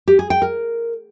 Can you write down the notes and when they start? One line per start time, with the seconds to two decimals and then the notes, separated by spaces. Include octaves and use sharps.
0.08 G4
0.19 G#4
0.30 G5
0.42 A#4